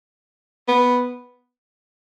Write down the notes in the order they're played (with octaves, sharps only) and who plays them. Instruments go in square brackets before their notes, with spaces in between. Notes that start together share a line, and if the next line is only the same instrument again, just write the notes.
[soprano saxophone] B3